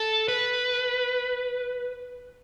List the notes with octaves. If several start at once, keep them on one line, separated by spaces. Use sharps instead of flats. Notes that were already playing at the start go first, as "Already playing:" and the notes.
Already playing: A4
B4